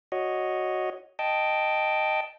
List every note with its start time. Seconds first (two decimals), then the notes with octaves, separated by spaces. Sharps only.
0.12 F#4 C#5 D#5
1.19 D#5 G5 A5